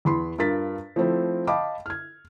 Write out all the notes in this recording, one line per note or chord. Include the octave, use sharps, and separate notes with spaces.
E2 B5 C6
G2 F4 A#4 A6 B6
F3 A3 C4 E4
D#5 F5 G5 A5 B5 D6
F6 G#6